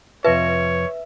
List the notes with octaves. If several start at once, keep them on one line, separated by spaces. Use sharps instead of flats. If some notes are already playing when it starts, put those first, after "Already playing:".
F2 C3 F4 B4 C#5 E5